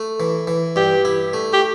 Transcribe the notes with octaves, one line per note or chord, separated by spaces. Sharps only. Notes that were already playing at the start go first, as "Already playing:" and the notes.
Already playing: A3
E3
E3
G2 G4
E4
A3
G4